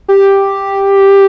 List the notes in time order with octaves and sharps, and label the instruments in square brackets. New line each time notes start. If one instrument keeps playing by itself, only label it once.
[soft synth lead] G4